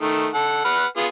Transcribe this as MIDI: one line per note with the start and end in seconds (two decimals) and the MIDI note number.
0.01 0.28 51
0.01 0.28 57
0.34 0.61 69
0.34 0.61 78
0.65 0.85 71
0.65 0.85 78
0.65 0.85 89
0.97 1.06 59
0.97 1.06 65
0.97 1.06 68